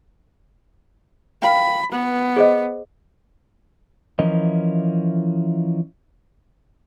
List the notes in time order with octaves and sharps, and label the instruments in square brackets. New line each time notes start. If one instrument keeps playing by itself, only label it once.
[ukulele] A#4 F5 G5 [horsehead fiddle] B5
[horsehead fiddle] B3 [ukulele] B4
[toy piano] G#4 C5 D#5
[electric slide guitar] E3 F3 C#4 E4 A#4 D#5